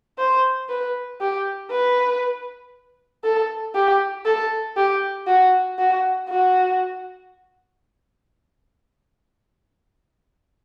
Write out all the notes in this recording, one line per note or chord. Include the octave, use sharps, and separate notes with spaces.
C5
B4
G4
B4
A4
G4
A4
G4
F#4
F#4
F#4